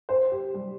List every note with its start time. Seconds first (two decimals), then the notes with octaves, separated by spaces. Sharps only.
0.09 C5
0.32 G4
0.54 G3